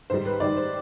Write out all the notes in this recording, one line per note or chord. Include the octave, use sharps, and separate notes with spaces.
G#2 D#3 G3 C5
B4
G#2 D#3 G3 D5
C5